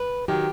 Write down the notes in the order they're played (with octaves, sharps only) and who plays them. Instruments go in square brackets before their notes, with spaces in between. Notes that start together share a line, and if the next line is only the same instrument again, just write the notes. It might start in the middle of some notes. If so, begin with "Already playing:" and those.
Already playing: [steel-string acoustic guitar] B4
[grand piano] D#3 F#3 [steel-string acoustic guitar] G4